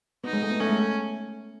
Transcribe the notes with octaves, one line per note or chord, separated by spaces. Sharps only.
B3 D#4
G#3
A3
B3
A3 C#4
G#3
A3